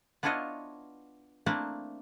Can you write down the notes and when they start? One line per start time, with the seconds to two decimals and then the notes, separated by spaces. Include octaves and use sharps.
0.23 B3 D4 E4 F4 C#5 D#5
1.46 A3 A#3 C4 D4 E4